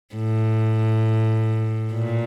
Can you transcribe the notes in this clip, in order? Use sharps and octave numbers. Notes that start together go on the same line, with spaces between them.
A2
A#2